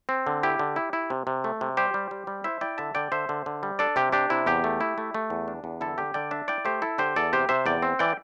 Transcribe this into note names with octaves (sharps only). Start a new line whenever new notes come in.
C4
D3
E4 G4
D3
E4
E4
C3
C3
A3
C3
G3 G4 C5
G3
G3
G3
E4 C5 E5
E4 D5 G5
D3 E5 A5
D3 D5 G5
D3 C5 E5
D3
D3
G3
D4 A4 D5
C3 G4
D4 G4
C3 E4
E2 G4
A3
E4
A3
A3
E2
D4
E2
D3 E4 A4
D3 G4
D3 D5 G5
D4 E5 A5
E4 D5 G5
A3 G4 C5
E4 A4
D3 G4 C5
E2 A4 D5
C3 G4 C5
C3 C5 E5
E2 D5 G5
C4
E3 D5 G5